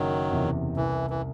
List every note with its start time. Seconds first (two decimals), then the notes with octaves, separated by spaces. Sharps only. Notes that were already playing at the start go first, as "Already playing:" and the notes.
Already playing: F#1 D#3 F#3
0.31 E2 C3
0.77 C2 E3
1.10 E3